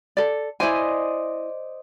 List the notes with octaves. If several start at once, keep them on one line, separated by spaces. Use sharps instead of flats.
A4 D5
E4 C5 D5 D#5 G#5